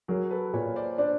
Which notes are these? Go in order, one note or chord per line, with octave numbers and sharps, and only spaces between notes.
F#3 G#4 A#4
A4 B4
A#2 B4 C#5
C5 D5
D4 C5 D5